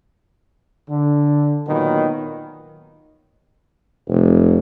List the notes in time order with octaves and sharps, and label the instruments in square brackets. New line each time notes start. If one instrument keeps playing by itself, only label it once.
[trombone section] D3
A#2 D#3 F#3 B3
[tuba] F1